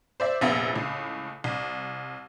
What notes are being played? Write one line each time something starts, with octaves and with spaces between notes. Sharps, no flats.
C5 D5 E5
F1 A#1 B3 E5
C#2 A2
C2